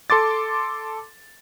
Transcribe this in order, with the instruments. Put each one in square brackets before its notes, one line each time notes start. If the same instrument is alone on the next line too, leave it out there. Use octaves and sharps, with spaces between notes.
[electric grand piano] A4 C6 D6 A6